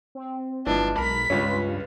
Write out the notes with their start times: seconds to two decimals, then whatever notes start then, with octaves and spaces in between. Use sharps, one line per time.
0.15 C4
0.66 G1 E3 F3 G#3 D4
0.98 B1 A#4 B5 B6
1.30 C#2 G2 G#3 C#4 F4 B4